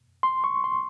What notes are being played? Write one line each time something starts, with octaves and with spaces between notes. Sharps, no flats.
C6
C#6
C6